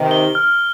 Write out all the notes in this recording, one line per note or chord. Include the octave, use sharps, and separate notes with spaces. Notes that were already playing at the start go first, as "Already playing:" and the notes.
Already playing: C3 D#3
G7
F6